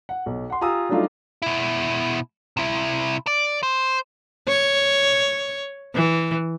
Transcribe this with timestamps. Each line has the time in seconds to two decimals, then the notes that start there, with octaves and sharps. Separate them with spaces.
0.09 F#5
0.26 B1
0.50 F#5 C6
0.61 F4 G4 G#5 A#5 D#6 E6
0.89 F#3 G3 A3 D4 D#4 F4
1.42 B2 E4
2.57 C3 E4
3.27 D5
3.63 C5
4.48 C#5
5.95 E3